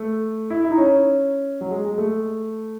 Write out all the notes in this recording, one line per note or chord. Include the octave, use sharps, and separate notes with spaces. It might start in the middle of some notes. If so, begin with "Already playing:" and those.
Already playing: A3
E4
E4
D#4
C#4
F#3
G#3
G#3
A3